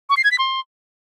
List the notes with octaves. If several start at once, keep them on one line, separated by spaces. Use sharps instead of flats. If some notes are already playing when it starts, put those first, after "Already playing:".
C#6
C7
G#6
B6
C6